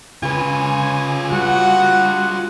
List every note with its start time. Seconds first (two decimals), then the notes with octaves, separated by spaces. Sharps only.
0.23 C#3 F4 B4 G#5
1.32 G3 F#4 F#5